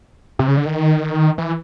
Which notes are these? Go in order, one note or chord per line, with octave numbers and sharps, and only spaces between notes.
C3
C#3
D3
D#3
E3